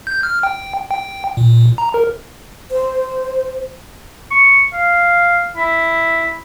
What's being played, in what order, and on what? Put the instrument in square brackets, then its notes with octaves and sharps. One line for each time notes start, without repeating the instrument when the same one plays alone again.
[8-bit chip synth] G6
F6
G5
G5
A#2
A#5
A#4
[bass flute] C5
[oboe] C#6
F5
E4